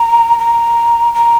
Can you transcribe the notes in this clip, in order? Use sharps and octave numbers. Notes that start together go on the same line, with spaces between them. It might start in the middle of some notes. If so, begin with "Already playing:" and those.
Already playing: A#5
A#5
A#5